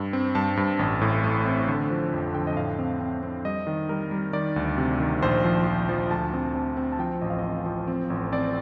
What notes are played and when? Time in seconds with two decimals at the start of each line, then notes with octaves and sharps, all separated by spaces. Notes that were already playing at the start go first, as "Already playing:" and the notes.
Already playing: G2
0.13 C4
0.35 G2 A5
0.57 G2
0.79 A1
1.01 A2
1.24 A3
1.46 C4
1.68 D3
1.90 F3
2.13 F2
2.35 D3 G5
2.47 D#5
2.56 A2 F5
2.79 C4
3.01 C4
3.23 C4
3.45 G3 D#5
3.67 D#3
3.89 G3 A#4
4.11 G3
4.33 D#3 D5
4.56 D2
4.78 C3
5.00 D#3
5.22 A#1 C5
5.44 F3
5.67 F3
5.89 F3
6.11 D2 A5
6.33 C4
6.55 C4
6.77 C4
6.92 A5
6.99 F3 G5
7.21 A1 D#5
7.30 F5
7.39 D#5
7.44 C4
7.66 F3
7.88 C4
8.10 A1
8.32 C4 D5